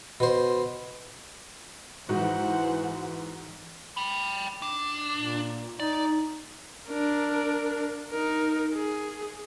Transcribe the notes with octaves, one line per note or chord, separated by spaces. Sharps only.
B2 C5
G#2 E3 F#4 C5 F#5
G5 B5
D4
A#2
D#4 D5
D4 A#4
D#4 A#4
G#4